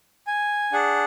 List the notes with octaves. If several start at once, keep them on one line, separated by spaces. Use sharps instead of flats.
G#5
D4 G#4 F#5